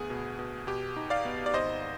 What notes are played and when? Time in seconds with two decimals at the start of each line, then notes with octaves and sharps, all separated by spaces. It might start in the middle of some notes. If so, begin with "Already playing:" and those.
Already playing: D2 B3 G#4
0.10 B2
0.39 B2
0.67 B2 G4
0.96 D#4
1.10 D5 F5
1.25 B3
1.46 D5
1.53 G#1 C5 D#5